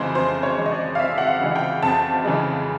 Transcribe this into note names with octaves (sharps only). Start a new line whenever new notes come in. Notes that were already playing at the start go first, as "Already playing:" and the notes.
Already playing: F2 C#3 E3 G#3 C5
F2 C5
C#5
C#3 E3 G#3
D#5
D5
F5
F2 E5
F#5
F5
C#3 E3 G#3
G5
F2 A5
C#3 E3 G#3